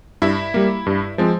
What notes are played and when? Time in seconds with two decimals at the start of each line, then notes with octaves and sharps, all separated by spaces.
0.22 G2 E4 E5
0.54 G3 A#3
0.86 G2
1.18 F3 G#3 C4